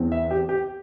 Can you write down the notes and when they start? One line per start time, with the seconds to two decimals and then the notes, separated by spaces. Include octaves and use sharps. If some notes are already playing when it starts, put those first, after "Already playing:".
Already playing: E2 E3 C4
0.12 E5
0.31 G4
0.49 G4